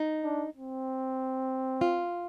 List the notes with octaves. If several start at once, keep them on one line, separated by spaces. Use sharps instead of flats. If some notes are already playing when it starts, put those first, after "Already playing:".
Already playing: D#4
D4
C4
F4